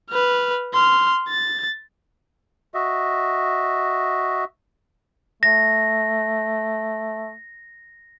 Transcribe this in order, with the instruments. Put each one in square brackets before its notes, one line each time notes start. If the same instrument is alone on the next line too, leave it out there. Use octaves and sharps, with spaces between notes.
[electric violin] B4 F6
C6 F6
A6
[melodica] F#4 D#5 E5
[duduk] A3 [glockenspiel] A#6